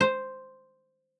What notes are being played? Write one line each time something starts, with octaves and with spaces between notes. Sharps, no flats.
C5